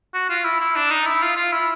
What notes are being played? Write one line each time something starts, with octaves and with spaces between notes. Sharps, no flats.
F#4
F4
E4
E4
D4
D#4
E4
F4
F4
E4